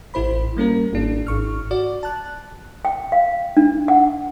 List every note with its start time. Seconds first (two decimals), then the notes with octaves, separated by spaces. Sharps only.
0.14 A1 E4 C5 B5
0.57 G3 A#3 C#4 A#4
0.93 G#1 D4
1.27 G#1 C#6 F6
1.71 F#4 D5
2.03 A5 F#6
2.85 G5
3.12 F5
3.57 D4
3.88 F#5